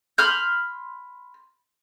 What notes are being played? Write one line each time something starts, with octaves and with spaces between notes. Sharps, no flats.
B5 C6 F6 G6